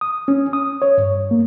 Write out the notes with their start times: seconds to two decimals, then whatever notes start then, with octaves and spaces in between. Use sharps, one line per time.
0.01 D#6
0.28 C#4
0.53 D#6
0.82 C#5
0.98 G2
1.31 A#3